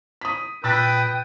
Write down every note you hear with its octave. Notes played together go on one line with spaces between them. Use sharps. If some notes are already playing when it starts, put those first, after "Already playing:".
D#6 B6
A#2 B4 G5 D#6 E6 A6 B6